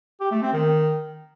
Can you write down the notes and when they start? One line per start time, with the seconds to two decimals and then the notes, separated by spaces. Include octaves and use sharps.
0.21 G4
0.31 A3
0.42 C4
0.53 D#3